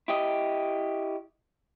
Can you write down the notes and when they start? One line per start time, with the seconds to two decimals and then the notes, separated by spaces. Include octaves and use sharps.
0.08 E4 G4 D#5